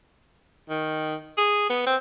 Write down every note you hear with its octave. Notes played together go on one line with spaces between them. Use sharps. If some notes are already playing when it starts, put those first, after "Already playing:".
D#3
G#4
B3
C4